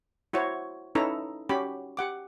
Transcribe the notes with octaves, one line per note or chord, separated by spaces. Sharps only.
E4 F#4 C5 C#5
C#4 D#4 E4 A4 B4 A#5
C#4 F#4 G4 B5
G4 F#5 D6